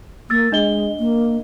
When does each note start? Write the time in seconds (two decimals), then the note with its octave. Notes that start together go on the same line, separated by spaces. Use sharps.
0.30 A#3 E6 A6
0.52 G#3 D4 D#5 G7
0.99 A#3